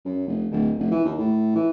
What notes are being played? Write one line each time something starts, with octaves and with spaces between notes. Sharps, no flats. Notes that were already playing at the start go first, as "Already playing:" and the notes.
F#2
F1
D1
F1
E3
D#2
A2
E3